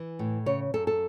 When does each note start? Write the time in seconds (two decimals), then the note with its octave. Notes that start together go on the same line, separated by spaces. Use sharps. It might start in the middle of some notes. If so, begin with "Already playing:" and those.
Already playing: E3
0.19 A2
0.46 C#3 C#5
0.74 F#2 A4
0.87 A4